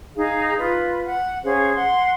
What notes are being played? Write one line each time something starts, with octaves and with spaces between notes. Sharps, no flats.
D#4 G#4 F5
F4 B4
F#5
C#4 G#4 C5 F5
F#5 C6